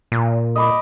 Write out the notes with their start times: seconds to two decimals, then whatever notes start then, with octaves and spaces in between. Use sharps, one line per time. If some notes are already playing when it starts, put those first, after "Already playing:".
0.12 A#2
0.56 D#5 B5 D6